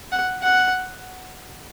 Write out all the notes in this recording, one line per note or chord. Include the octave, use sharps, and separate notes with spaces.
F#5
F#5